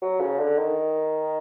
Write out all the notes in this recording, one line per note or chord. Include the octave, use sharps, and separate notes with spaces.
F#3
C#3
D3
D#3